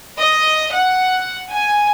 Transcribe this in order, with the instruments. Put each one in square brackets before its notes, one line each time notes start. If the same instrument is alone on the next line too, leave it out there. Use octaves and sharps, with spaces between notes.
[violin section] D#5
F#5
G#5